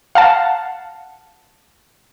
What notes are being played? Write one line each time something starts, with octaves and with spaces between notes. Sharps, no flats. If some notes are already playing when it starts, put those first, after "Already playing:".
F5 F#5 A5